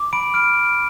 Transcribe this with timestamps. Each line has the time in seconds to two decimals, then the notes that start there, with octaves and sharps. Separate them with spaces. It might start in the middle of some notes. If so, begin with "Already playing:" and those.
Already playing: D6
0.13 B5 D7
0.34 F6 D7